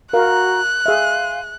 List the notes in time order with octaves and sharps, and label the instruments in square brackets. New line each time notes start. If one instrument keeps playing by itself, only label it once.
[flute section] F#4 A#5 [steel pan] A#4 F5 [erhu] F#6
[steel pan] G#4 E5 [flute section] F5 G#5 C6